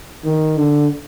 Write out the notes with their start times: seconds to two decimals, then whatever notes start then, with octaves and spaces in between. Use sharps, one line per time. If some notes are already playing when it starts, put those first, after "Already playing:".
0.25 D#3
0.57 D3